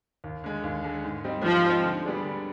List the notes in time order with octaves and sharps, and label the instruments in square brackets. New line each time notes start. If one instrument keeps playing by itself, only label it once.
[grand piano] D#2
D3 G#3
D#2
D3 G#3
G#2
G3 C4 D#4
[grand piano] G#2 [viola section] F3
[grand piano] G3 C4 D#4
D3
G3 B3 D4 G#4
D3